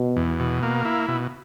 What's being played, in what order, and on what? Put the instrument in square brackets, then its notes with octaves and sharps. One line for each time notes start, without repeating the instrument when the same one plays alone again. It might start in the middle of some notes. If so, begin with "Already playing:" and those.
Already playing: [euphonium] B2
[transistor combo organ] E2
B2
A#3
E4
B2